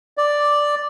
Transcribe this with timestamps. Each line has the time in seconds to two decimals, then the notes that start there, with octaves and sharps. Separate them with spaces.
0.17 D5